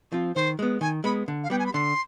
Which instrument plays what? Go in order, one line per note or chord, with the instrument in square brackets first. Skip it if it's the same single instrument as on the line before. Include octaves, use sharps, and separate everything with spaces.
[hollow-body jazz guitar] F3 C4 F4
[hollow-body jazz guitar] D#3 [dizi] C5
[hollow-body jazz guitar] G#3 B3
[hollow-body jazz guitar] D#3 [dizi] G#5
[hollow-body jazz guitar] G#3 B3 [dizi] B5
[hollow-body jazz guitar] D3
[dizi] F5
[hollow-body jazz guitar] G3 B3 [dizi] G5
[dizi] G#5
B5
[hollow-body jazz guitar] D3 [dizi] C6